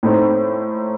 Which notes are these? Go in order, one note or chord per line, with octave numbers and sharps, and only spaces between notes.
A2 A3 C4 D#4